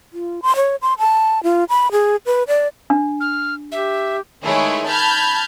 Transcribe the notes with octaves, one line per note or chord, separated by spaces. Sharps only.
F4
C6
C#5
C6
A5
F4
B5
G#4
B4
D5
D4
F6
G4 E5
D#3 G#3 A3 E4 G#4 C#5
A5 B5 F6 G6 G#6